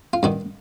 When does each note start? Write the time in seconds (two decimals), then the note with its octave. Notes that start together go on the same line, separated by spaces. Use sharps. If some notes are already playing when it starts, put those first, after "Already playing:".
0.13 F4
0.23 G2 D#3 F#4